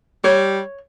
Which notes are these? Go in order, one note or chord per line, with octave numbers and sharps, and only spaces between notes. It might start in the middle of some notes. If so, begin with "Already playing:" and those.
G3 C#5